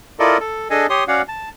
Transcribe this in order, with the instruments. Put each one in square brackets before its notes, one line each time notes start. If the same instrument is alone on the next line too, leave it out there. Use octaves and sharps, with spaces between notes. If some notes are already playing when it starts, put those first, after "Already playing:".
[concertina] E4 F4 A4 A#4 D5 D#5
A4
D4 G#4 A4 D#5 G#5
G4 C#5 C6 D#6
C#4 F#4 C#5 D5 F5 F#5
A5